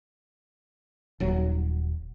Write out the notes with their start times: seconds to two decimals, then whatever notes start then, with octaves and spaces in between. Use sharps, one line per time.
1.20 D#1 F#3